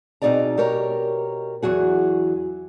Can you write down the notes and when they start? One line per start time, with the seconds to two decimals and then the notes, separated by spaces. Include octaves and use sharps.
0.22 B2 C4 D#4 G#4 D5 A#5
0.57 B2 G4 A#4 C#5 A#5
1.62 E2 F#3 F#4 G#4